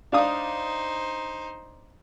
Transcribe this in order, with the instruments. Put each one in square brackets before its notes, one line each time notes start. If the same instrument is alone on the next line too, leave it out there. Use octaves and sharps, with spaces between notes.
[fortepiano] D4 F5 D#6 [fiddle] D#4 C5